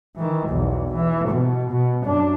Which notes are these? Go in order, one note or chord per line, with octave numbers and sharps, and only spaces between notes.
D#3 E3
B1 E2
E3
B2
B2
F#2 D4